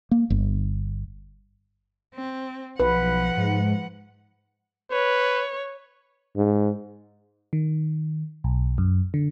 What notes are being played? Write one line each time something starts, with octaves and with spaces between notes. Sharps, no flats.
A#3
G1
C4
B1 F3 B4 F#5
G#2
B4 C#5
G#2
D#3
B1
F#2
D3